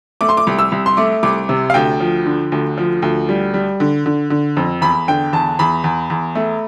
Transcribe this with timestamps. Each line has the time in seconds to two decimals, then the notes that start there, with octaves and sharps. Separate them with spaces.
0.21 A3 D6
0.29 C6
0.37 D6
0.47 C2
0.59 E6
0.72 C2
0.86 C6
0.97 A3 D6
1.23 C2 D6
1.49 C3
1.70 F5
1.74 D2 G5
2.00 F3
2.26 D3
2.52 D2
2.78 F3
3.02 D2
3.29 G3
3.54 G3
3.80 D3
4.06 D3
4.30 D3
4.57 F2
4.81 E2 B5
5.08 D3 G5
5.33 E2 A5
5.59 E2 B5
5.84 E2
6.10 E2
6.35 A3